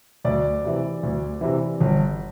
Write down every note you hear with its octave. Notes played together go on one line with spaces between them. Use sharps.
D2 D5
C3 E3
D2
C3 E3
G1